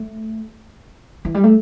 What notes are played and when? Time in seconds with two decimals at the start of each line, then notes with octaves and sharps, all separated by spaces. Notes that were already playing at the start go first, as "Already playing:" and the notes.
Already playing: A3
1.25 E3
1.34 G3
1.44 A3